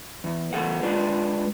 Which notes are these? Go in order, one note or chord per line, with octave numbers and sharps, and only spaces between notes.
E2
E2 G#2 A4 F#5
G#3 D4 F4 G#4 B4